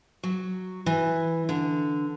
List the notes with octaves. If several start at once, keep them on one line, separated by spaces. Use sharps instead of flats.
F#3
E3
D3